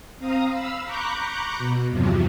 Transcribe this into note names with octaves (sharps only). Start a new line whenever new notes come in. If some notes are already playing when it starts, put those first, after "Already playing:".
C4 F5 A#5 D#6
F5 B5 E6
A#5 B5 C#6 D6 F#6 G6
B2
E2 G2 C3 F3 F#3